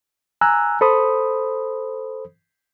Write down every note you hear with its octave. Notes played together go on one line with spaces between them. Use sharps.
G#5 A#5 E6 F#6
A4 C5 B5 D#6